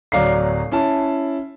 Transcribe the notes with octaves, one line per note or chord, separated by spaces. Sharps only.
D1 F#3 D5 F5 A#5 C7
C#4 E4 A5